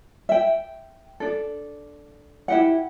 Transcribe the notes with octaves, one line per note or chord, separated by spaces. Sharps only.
E5 G5
D4 A4
E4 G4 F#5